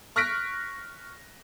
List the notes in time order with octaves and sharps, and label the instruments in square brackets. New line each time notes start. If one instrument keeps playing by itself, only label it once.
[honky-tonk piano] C#6 F6 F#6 A#6 B6 D7